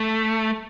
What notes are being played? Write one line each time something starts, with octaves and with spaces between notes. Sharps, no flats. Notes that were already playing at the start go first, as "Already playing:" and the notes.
Already playing: A3